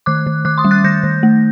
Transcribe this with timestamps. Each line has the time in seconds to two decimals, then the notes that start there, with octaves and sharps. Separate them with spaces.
0.06 D#3 D6 F#6
0.27 D#3
0.45 D#3 D6 F#6
0.58 C6 D#6
0.65 G3
0.71 F#6 A6
0.84 D#3 G6 A#6
1.03 D#3
1.23 A3